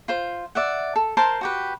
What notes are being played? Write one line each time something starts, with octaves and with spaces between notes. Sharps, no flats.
F4 C5
D5 E5 F#5
A4
A#4 C5 A5 C6
F#4 G4 B4